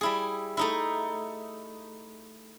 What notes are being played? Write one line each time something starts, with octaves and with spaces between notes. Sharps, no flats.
G3 E4 G#4
A3 D#4 E4